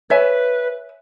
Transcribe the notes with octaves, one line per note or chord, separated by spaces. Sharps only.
B4 C#5 E5 G#5